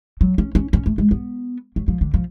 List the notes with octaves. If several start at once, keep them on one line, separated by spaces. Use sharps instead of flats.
F#3
C#4
C#4
C#4
A3
G#3
B3
F#3
F3
D3
F3